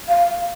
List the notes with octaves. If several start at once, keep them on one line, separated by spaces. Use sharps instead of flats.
F5